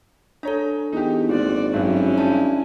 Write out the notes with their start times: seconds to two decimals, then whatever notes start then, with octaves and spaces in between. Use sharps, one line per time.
0.43 D4 A4 C#5 A#5
0.92 E2 D#4 G4
1.29 G#1 A#2 F#4 D5
1.74 G2 F#3 C#4 E4
2.18 D4 D5 A5